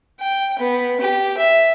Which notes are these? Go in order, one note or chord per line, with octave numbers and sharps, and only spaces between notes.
G5
B3
G4
E5